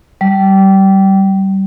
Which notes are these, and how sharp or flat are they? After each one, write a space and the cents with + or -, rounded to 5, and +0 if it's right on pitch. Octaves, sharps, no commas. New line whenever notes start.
G3 -20